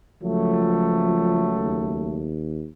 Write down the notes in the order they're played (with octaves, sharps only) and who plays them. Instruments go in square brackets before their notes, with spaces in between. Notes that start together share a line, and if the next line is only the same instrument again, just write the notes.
[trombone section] C#2 F#3 A3 [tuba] F3
[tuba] D#2